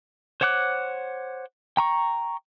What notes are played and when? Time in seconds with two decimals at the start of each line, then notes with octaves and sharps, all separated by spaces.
0.41 C5 C#5 F#5 D6 F#6
1.77 G5 A#5 C#6